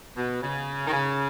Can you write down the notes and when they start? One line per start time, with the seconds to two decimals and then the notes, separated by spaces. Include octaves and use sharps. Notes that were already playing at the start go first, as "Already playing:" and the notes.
0.17 B2
0.43 C#3
0.87 D#3
0.93 C#3